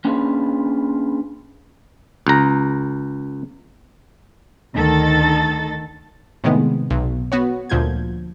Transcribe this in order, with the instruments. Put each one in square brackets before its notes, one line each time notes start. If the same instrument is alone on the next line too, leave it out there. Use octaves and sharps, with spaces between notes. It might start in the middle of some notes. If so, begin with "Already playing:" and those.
[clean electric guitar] A#3 C#4 D4 F4 G#4 B4
[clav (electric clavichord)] C#2 A#5
[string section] D2 D#3 A4 A6
[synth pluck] A2 C3 D#3 G#3 B3
B1
B3 F#4 C#5
D2 A#2 F3 G6 G#6